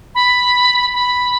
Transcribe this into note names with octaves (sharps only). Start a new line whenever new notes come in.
B5
B5